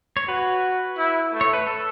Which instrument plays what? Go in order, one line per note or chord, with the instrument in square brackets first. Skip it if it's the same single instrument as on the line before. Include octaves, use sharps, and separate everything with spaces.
[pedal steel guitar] C#5
[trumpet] F#4 [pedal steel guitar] B4
[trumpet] E4
A3
[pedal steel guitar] C#5
B4
A4